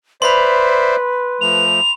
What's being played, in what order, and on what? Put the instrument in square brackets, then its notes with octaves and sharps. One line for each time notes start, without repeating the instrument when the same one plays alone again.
[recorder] B4 [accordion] C5 D5 E5 [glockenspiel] B5 C6
[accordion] F3 A3 [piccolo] F7